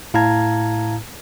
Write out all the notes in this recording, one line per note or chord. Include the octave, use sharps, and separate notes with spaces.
A2 E4 F5 A5 A#5 G#6